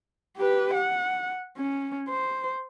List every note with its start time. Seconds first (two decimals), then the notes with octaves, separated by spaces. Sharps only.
0.37 G4 B4
0.74 F#5
1.57 C#4
2.08 C5